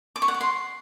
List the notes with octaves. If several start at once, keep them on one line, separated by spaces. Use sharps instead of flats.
D6
C#6
F#5
C#6
C6